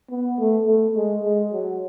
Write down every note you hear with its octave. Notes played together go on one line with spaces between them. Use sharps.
B3
A3
A3
G#3
G#3
F#3